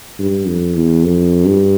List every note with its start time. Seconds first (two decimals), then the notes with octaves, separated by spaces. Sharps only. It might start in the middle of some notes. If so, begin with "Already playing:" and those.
0.19 G2
0.48 F2
0.76 E2
1.04 F2
1.47 G2